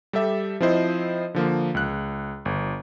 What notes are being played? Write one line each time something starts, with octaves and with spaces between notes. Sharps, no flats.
G3 G4 A4 E5
F3 C4 E4 C5 D#5
D3 F3 A#3
C#2 F#6
G1